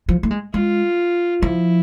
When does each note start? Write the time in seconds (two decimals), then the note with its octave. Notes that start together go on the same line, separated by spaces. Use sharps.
0.09 F3
0.23 A3
0.31 G#3
0.53 G#3 F4
1.43 F3 E4